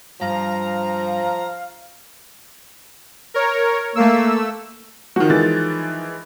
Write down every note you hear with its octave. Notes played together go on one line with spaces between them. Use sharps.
G2 F3 F5 A#5
A#4 C#5
A3 A#3 E6
D#3 F3 F#4
E3 G#3 A6